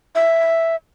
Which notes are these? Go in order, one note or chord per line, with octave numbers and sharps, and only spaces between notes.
E5